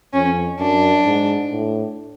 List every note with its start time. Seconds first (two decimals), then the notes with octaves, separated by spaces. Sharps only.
0.13 F2 C#4
0.59 F#2 D4
1.05 G#2
1.51 A2